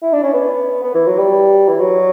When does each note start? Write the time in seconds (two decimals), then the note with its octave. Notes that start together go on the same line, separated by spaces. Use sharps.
0.02 E4
0.13 D4
0.23 C#4
0.33 B3
0.83 B3
0.94 E3
1.07 F#3
1.18 G3
1.68 E3
1.80 F#3